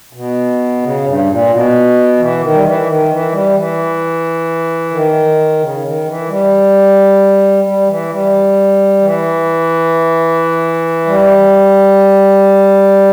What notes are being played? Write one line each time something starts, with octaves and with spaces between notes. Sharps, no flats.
B2
C#3
G2
A#2
B2
E3
D#3
G3
E3
D#3
E3
G3
E3
D#3
C#3
D#3
E3
G3
G3
E3
G3
E3
G3